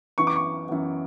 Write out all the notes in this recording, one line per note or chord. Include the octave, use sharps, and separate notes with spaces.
F#2 E3 B3 C#6
D6
C#6
F#2 E3 B3